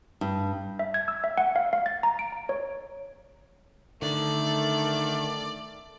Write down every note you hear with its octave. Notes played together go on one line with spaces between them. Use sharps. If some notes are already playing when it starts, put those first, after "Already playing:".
G2
E5
G#6
E6
E5
F#5
F5
F5
A6
A#5
D7
A#5
C#5
D3 D#3 A3 D5